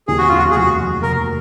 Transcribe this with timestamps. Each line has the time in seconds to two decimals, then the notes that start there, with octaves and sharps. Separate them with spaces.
0.08 D#2 G#4
0.18 F#4
0.29 D#2 F4
0.39 F#4
0.51 G#4
0.55 F1 F#4
0.79 F1
1.02 F1 A#4